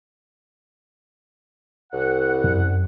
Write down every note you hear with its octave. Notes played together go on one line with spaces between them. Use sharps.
C2 F#5
F#2